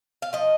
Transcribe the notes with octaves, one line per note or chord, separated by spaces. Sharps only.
F5
F3 D#5